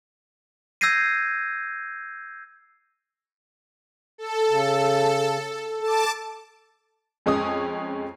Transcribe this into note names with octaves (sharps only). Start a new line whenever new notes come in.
E6 G6 G#6 A#6 C7 D#7
A4
C#3
A4 A5 D6
F2 G#3 C#4 D#6